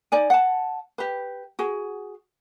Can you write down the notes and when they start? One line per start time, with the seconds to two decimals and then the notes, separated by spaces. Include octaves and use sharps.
0.12 D#4 D5 G#5
0.30 F#5 A5
0.98 G4 B4
1.59 F#4 G#4